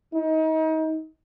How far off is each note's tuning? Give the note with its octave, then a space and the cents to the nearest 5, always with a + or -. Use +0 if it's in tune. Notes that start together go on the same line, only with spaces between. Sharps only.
D#4 +30